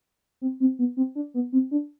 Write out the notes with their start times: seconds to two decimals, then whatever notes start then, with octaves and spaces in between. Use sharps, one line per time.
0.41 C4
0.60 C4
0.79 B3
0.97 C4
1.15 D4
1.34 B3
1.52 C4
1.71 D4